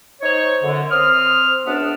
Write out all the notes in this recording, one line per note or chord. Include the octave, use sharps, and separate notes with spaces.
D#4 C5 C#5
F#2 D3
C4 D#6 F6
C#2 F#2 B3 D4